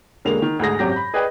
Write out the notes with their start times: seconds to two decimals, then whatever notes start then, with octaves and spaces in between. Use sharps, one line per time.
0.25 E1 D3 G#3 A#3 F7
0.42 D#3
0.59 D2 G#2 G#4 A#6
0.79 G#1 F#2 C3 F#3 G4 A#6
0.92 B5 G6
1.14 G#4 B4 D5 D#5 G5 G#5